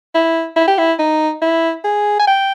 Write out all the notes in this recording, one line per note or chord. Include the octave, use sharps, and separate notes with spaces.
E4
E4
G4
E4
D#4
E4
G#4
G#5
G5